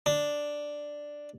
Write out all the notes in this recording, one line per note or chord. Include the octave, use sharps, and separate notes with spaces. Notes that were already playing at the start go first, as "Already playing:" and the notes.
D4